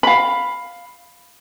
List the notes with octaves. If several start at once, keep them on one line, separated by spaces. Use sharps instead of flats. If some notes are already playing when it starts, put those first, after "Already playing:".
F5 B5